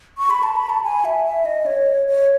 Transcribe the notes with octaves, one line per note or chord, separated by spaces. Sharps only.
C#6
B5
A5
B5
A5
G#5
E5
E5
D#5
C#5
C#5